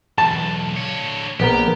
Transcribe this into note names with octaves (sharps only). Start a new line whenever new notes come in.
B1 E2 A5
D3 C#5
A#1 B3 G4 A#4